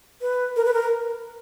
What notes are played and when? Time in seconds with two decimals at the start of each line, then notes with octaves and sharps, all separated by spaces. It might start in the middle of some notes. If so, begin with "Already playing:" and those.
0.21 B4
0.56 A#4
0.65 B4
0.73 A#4